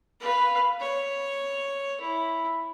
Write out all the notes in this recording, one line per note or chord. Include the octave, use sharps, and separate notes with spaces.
B4 F5
C#5
E4